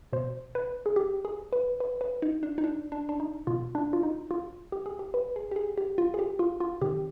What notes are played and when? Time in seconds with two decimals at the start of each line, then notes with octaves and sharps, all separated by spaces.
0.13 B2 C5
0.55 B4
0.86 G#4
0.96 G4
1.25 G#4
1.53 B4
1.80 B4
2.01 B4
2.22 D#4
2.43 D4
2.58 D#4
2.64 D4
2.92 D4
3.09 D4
3.20 D#4
3.47 B2 F4
3.75 D4
3.93 F4
4.03 D#4
4.31 F4
4.72 G4
4.86 G#4
4.99 G4
5.14 B4
5.36 G#4
5.51 G4
5.56 G#4
5.78 G4
5.98 F4
6.14 G#4
6.19 G4
6.39 F4
6.60 F4
6.82 C3 D#3 G4